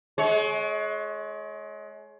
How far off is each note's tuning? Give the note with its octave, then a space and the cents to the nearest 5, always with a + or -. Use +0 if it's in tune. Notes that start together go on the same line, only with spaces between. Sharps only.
G#3 +30 C#5 +0